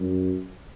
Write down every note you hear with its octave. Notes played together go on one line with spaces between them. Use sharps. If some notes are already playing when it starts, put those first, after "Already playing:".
Already playing: F#2